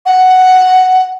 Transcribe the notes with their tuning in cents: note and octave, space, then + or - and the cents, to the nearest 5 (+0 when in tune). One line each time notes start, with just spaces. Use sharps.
F#5 +5